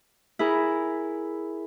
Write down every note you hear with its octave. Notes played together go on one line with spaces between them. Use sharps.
E4 G#4 A#4